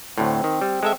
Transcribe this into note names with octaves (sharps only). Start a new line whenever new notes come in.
D2 A2 C4
D#3
G3
G#3 A4 E5